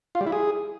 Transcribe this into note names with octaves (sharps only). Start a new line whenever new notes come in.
F4
G3
E4
G#4